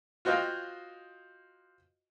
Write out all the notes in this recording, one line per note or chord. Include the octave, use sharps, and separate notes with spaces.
F4 F#4 C5 D#5 F5 G5